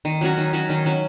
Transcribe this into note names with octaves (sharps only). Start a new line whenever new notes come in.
D#3
F#3 C#4 F#4
D#3
F#3 C#4 F#4
D#3
F#3 C#4 F#4